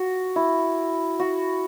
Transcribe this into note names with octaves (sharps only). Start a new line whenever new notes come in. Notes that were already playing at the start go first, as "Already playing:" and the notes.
Already playing: F#4
E4
F#4